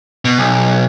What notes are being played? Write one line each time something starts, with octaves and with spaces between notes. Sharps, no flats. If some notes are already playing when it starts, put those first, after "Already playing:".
B2
B1